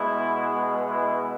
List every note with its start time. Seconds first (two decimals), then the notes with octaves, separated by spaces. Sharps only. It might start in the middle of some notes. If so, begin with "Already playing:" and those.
Already playing: B2 G#3 B3 E4
0.89 E4